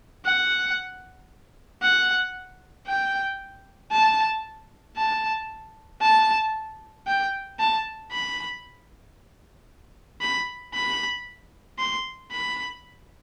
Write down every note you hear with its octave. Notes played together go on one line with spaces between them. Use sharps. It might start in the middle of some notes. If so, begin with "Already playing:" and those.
F#5
F#5
G5
A5
A5
A5
G5
A5
B5
B5
B5
C6
B5